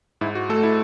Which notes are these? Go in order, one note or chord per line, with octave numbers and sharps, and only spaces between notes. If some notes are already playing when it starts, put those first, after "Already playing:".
G#2 E4
F#4
A3 A4
E4